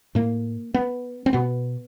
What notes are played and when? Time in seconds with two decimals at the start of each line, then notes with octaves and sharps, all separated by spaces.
0.15 A2 A#3
0.74 B3
1.26 C4
1.33 B2 B3